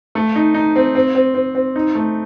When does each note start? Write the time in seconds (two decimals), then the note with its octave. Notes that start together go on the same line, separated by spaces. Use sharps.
0.15 A3
0.36 D#4
0.54 D#4
0.76 C4
0.95 C4
1.15 C4
1.35 C4
1.55 C4
1.76 D#4
1.95 A3